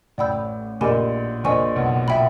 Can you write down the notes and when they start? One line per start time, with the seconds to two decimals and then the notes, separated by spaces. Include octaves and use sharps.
0.18 A1 A2 D5 G5 B5 E6 G6
0.81 A#1 A#2 G4 A#4 D#5 G#5 B5
1.44 A#1 A#2 C5 D#5 G#5 C#6
1.76 B1 B2
2.08 A#2 E5 G5 B5